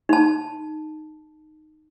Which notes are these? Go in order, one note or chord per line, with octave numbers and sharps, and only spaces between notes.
D#4 A5